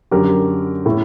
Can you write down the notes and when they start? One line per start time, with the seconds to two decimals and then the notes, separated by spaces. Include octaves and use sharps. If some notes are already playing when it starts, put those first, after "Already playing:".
0.11 F#2 D3 G4 A#4
0.86 A2